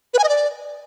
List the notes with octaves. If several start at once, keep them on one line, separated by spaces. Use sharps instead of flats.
B4
G#5
D#5
D5